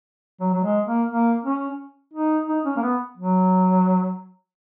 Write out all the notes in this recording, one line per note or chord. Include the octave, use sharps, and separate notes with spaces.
F#3
F#3
G#3
A#3
A#3
C#4
D#4
D#4
C#4
A#3
B3
F#3